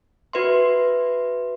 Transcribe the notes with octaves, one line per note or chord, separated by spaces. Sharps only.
F#4 B4 E5 C6